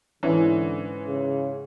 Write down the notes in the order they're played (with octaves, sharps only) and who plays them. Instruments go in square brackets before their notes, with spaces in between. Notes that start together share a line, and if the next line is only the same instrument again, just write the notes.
[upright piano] G#2 C#4 [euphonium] D3 [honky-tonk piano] E3
[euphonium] C#3